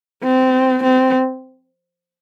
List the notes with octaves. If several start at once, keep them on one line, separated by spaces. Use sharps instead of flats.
C4
C4